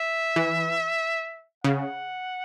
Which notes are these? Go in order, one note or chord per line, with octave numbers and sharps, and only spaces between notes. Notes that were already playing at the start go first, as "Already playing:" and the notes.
Already playing: E5
E3
C#3 F#5